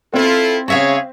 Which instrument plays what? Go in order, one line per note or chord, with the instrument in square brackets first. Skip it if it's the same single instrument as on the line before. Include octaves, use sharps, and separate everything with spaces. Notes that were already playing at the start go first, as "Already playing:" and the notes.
[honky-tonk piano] C4 [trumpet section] E4 F4 [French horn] A4
[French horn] C#3 [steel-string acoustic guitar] F#4 E5 F5 [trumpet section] G#4 C#5